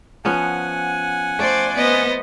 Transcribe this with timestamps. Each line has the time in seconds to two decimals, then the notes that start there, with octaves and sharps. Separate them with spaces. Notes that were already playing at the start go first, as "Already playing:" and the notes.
0.25 F3 B3 C#4 F#5 G#5
1.39 A3 C5 D5
1.77 B3 C5 D#5